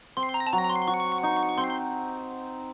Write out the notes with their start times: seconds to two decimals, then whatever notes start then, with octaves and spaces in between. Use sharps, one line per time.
0.17 C4 C6
0.34 A#5
0.47 A5
0.52 F#3 A#5
0.70 C6
0.88 F#4 C#6
1.23 D#4
1.58 C4 C6